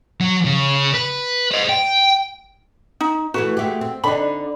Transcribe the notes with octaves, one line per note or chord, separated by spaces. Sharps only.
F#3
C#3
B4
C5 D#5
G5
D#4
E3 A3 F#4 B4
G#3 A3 G4
C4
D3 D4 D#4 B5